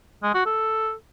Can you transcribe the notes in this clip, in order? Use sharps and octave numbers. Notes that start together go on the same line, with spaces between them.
G#3
F#4
A4